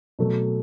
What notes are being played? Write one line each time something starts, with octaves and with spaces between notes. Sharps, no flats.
B2 F#3 A3